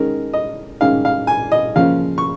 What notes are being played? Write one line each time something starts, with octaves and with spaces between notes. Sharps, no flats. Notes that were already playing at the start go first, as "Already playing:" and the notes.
Already playing: D#3 G#3 C#4 A#4
D#5
D#3 G#3 C#4 F5
F5
G#5
D#5
C#3 F3 A#3 C#4 F5
C#6